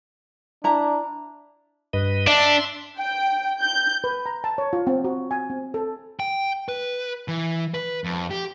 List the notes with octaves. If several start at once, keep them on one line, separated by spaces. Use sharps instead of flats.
D4 E4 A#5
G2 B4 D#5
D4 E5 C6
G5
G6
B4
A#5
A5
C#5
F4
C4
F#4
G#5
C4
A4
G5
B4
E3
B4
F2
G4